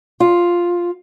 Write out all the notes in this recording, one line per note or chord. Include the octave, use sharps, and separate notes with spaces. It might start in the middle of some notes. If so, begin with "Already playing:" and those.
F4